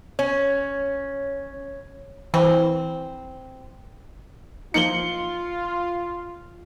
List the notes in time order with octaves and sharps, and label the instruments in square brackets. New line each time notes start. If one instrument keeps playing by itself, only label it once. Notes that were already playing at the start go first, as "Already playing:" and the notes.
[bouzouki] C#4 [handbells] C#5
[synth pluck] E3 [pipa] C4
[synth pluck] F3 A#3 D#4 [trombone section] F4 [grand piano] C#7 F#7 G7